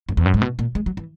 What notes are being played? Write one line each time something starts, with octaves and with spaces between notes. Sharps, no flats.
F#2
E2
F#2
G#2
B2
A#2
G#3
F#3
E3